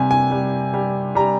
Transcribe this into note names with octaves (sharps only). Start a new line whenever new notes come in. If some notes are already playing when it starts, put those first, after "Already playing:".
Already playing: C3 G3 G#5
G#5
G3
G3
G3 A#5